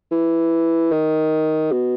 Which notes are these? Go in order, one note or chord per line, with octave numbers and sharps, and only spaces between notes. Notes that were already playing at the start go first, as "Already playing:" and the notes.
E3
D#3
B2